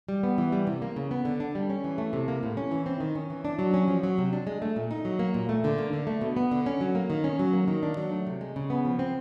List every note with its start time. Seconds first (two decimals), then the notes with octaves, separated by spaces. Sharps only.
0.09 G3
0.23 B3
0.38 E3
0.52 G3
0.67 C3
0.82 A#3
0.96 C#3
1.11 B3
1.25 D3
1.40 D4
1.55 G3
1.70 C#4
1.84 E3
1.98 A3
2.13 C3
2.28 A#3
2.43 A2
2.57 C#4
2.71 E3
2.86 C4
3.00 D#3
3.15 C#4
3.30 E3
3.45 D4
3.59 F#3
3.74 C#4
3.88 F3
4.03 F#3
4.18 C3
4.33 D4
4.47 G#3
4.62 A3
4.76 A#2
4.91 D#4
5.05 F#3
5.19 A#3
5.34 A#2
5.49 A3
5.64 D3
5.78 A#3
5.93 D3
6.07 A3
6.21 B2
6.37 B3
6.51 D3
6.66 C#4
6.81 F#3
6.95 A#3
7.10 D#3
7.24 C#4
7.39 F#3
7.53 A#3
7.68 D#3
7.83 D4
7.97 F#3
8.11 A3
8.27 C3
8.41 G#3
8.56 C#3
8.70 B3
8.85 F3
8.99 C4